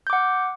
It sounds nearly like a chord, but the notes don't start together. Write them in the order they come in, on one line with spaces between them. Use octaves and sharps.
G6 D6 F#5